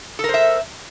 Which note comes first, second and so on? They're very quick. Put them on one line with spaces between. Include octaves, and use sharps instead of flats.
A4 A#4 C5 E5